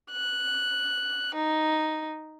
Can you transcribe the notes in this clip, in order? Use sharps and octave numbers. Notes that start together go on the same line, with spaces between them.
F#6
D#4